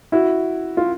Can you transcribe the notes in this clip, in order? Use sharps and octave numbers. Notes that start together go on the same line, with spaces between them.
E4 F#4
F4